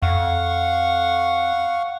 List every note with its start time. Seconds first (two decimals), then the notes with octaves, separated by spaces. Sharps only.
0.02 F2 F5 F#5 C#6